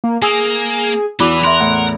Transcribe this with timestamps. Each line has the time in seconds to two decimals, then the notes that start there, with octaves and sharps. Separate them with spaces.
0.04 A#3
0.22 A#3 G#4 G#5 D#6 E6
1.20 E2 E3 E4 F#4 B5 D6
1.44 A#4 E5 C6 F#6
1.61 A2 F#5